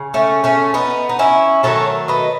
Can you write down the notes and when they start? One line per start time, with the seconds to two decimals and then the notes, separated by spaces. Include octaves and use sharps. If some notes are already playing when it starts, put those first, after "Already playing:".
Already playing: C#3
0.14 A3 C#4
0.44 A3 C#4
0.74 B3 D#4
1.09 D#4
1.19 C#4 E4
1.63 D#3 F#3 A3 A4 C#5
2.08 B4 D#5